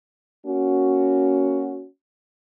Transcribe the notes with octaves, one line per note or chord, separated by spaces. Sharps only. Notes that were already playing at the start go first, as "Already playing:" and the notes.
A#3 C#4 F#4